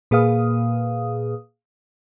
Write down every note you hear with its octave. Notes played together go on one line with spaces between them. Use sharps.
A#2 A#3 G#4 B4 F5 D#6